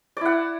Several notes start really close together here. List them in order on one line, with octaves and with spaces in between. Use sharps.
D5 E4 F#5